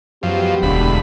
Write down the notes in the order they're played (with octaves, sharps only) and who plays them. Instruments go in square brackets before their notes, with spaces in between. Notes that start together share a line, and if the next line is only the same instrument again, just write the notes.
[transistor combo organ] F#2 F3 [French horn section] G#3 B3 G4
[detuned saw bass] E1 [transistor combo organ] D2 B5